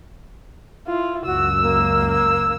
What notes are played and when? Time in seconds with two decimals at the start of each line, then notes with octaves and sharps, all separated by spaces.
0.87 E4 F4
1.25 C#2 F#2 F#4 E6
1.62 A#3
2.11 E6